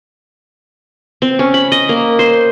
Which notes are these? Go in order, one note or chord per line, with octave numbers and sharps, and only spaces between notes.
C4
C#4
B5
D#5
A#3
C5